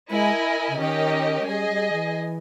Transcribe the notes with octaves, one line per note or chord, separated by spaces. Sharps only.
G#3 E4 A#4 D#5 G#5
C#3
D#3 C#4 G4 A#4 D#5
G#3
G3 G#4 D#5 G#5
G3
E3